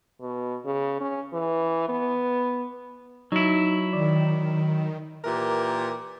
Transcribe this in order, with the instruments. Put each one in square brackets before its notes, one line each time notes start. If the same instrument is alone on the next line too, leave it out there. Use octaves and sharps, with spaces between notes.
[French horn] B2
C#3
C#4
E3
B3
[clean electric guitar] F#3 E4 [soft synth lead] D#4
[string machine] D#3 [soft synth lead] D5
[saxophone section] A#2 E3 G4 A#4